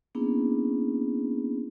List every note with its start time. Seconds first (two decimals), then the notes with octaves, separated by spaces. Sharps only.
0.15 A#3 B3 C#4 D4 E4 G#4